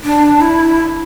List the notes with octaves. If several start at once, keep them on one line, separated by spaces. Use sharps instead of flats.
D4
E4